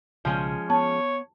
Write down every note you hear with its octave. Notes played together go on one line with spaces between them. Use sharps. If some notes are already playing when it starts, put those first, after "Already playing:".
B1 C#3 F3 G#3 C#4
B3 C#5 A5